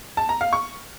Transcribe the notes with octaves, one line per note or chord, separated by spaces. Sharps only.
A5
A#5
F5
C#6